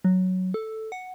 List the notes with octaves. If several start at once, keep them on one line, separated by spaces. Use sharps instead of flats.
F#3
A4
F#5